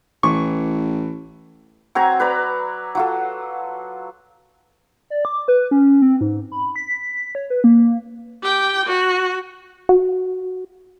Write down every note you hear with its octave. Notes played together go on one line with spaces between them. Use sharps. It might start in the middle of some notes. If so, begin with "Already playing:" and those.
A1 E3 C#6
F#3 C4 G#5 A#5
B4 D5 A#5
F#3 F4 A4
D5
D6
B4
C#4
C4
G#2
B5
B6
C#5
B4
A#3
G4 G5
F#4
F#4